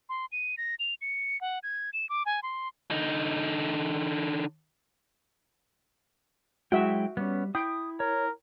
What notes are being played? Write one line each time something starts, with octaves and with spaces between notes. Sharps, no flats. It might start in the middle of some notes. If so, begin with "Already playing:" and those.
C6
D#7
A#6
F7
C#7
F#5
G#6
E7
D6
G#5
C6
D3 D#4
F#3 G#3 E4 F#4 E5 G5
G3 B3 C#4
E4 G5 D#6
A#4 C#5